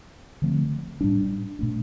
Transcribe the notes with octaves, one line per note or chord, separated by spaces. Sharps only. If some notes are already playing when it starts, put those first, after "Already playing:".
D3 F3 A3 C4
A2 G3 D4
A#2 A3 D4